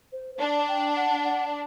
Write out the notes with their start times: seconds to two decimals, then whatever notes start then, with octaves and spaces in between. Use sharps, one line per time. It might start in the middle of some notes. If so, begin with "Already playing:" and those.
0.13 C5
0.35 C5
0.40 D4 D5
0.68 G5
0.96 F#5
1.24 F#5